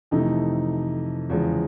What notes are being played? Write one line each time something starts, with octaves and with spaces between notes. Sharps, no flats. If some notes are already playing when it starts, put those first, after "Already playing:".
F2 C3 E3 A3 D#4
E2 C#3 F3 G#3